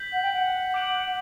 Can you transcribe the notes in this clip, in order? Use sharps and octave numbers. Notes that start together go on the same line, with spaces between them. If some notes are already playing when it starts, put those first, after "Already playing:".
Already playing: G6 B6 F#7
F#5
G5
F#5
D6 G6 D7 F#7